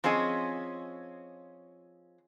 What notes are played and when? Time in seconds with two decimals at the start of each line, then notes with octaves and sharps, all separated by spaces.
0.04 F3 C4 C#4 G#4 D#5